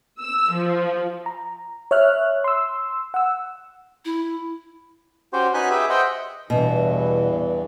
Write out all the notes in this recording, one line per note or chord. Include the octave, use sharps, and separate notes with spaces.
E6
F3
A#5
C#5 E5 F6 F#6
C6 E6
F#5 E6
E4
C#4 F#4 G4 C5
C#4 D#4 F#4 B4 G#5 F#6
G4 G#4 B4 E5
C5 D#5 E5 F#5 G5
E2 G2 B2 E3